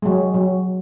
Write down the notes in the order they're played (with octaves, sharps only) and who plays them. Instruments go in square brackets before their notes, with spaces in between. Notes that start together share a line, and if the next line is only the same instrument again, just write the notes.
[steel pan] F#3 G#3
F#3